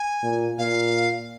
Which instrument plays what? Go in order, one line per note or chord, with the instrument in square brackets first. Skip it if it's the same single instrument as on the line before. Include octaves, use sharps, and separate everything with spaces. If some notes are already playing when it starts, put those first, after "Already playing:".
Already playing: [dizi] G#5
[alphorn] A#2
[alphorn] A#2 [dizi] F5